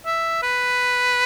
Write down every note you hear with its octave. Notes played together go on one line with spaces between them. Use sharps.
E5
B4